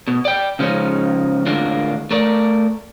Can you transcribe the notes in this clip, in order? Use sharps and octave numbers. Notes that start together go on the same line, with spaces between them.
B2
D5 G5
C#3 F3 G#3 C#4 D#4
A2 D3 G#3 A#3 D4 F4
A3 A#4 D5